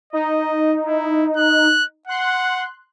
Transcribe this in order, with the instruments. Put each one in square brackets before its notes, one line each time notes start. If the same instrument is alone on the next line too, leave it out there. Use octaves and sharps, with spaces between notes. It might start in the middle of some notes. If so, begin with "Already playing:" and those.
[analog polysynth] D#4 [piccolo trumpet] D#5
[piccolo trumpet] E4
F#6
[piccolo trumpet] F#5 [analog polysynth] C6 F#6